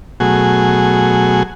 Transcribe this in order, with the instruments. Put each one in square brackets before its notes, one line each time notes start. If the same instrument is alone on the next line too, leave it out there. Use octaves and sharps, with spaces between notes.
[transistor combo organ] B2 F#3 A3 F#4 G#4 G#5